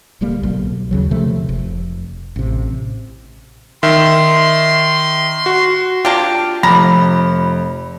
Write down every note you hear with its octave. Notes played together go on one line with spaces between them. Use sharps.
D1 D2 G3 A#3
B1
D#2 C#3 F#3
C3 F3 A3
F1
A1 C3
D#3 E5 C6
F#4
A#3 D4 F4 G4
F1 F2 A#5 B5 D6